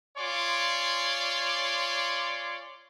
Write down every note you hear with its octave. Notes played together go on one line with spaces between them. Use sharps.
F4 C#5 D5 G#5 C6 D6